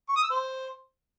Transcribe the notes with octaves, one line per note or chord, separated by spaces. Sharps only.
C#6
D#6
E6
C5